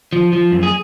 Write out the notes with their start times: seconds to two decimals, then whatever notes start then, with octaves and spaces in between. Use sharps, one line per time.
0.13 F3
0.33 F3
0.52 F#2
0.63 G#4